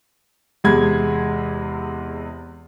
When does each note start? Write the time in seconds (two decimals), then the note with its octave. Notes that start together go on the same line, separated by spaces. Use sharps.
0.64 E2 C3 G#3 B5 G#6